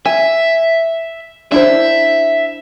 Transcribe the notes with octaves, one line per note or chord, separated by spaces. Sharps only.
E5 G#5
D4 E4 C5 E5